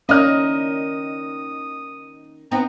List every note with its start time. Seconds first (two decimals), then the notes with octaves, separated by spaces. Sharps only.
0.09 D#3 A#3 C#4 E4 D5 D#5 D#6 F6
2.51 B3 C4 D#4 A#5